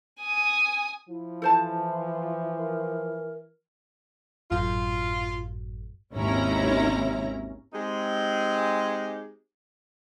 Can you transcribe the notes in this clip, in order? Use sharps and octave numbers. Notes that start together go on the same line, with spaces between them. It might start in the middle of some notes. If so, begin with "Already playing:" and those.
G#5 D#6
F3 E4
E3 A4 C5 A5
A#4
G#1 F#2 A2 F4
G#1 D#2 C3 C#4 E4 A#5
G#3 C4 D#4 G4 G#4